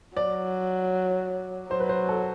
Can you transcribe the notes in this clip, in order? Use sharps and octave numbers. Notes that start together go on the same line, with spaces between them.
F#3 D5
F#3 C5
B4
C5
A4